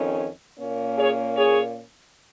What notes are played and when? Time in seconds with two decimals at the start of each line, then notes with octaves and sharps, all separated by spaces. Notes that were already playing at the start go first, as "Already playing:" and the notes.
Already playing: F2 D#3 C#4
0.58 A#2 A#3 C#4
0.97 G#4 C#5
1.35 G#4 C#5